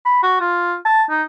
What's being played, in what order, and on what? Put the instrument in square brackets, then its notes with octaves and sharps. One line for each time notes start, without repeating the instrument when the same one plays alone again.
[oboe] B5
F#4
F4
A5
D#4